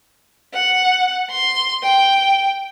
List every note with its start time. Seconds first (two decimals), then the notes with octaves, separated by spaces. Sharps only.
0.54 F#5
1.31 C6
1.83 G5